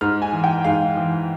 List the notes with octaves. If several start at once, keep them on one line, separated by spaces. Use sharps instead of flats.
G#2 F6
G#5
E3
G5
G#2 F5
E3